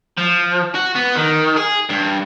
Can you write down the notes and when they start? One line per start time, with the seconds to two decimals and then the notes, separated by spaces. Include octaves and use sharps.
0.17 F3
0.75 F#4
0.95 B3
1.15 D#3
1.56 G#4
1.89 G2